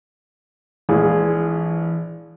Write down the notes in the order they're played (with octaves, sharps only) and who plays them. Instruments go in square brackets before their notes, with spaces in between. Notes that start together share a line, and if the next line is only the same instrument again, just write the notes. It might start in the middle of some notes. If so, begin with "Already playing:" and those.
[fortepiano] A#1 G#3 [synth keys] E3 [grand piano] G#4